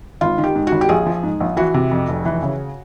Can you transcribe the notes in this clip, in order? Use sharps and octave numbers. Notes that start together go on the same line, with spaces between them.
G#1 F4
D#3
G4
G#2
G#1 F#4
G4
A#1 G#4
F3
G#2
A#1
E3 F#4
C3
F2
F1
E3
C#3